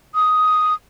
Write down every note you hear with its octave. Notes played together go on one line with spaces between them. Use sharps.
D#6